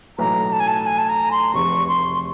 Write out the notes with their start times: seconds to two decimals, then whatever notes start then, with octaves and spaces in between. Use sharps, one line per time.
0.18 B1 A2 E3 A#5
0.53 A5
0.60 G#5
0.68 A5
0.86 G#5
0.99 A5
1.09 A#5
1.31 C6
1.54 F1 E2 C3 C#6
1.88 C6